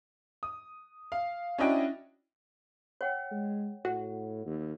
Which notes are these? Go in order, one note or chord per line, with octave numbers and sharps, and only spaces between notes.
D#6
F5
C#4 D4 E4 F#4 D#5 G5
C#5 F#5 G5
G#3
A2 F#4 F#5
D#2